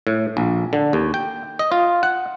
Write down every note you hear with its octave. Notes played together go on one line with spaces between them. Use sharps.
A2
A#1
D3
D#2
G5
D#5
F4
F#5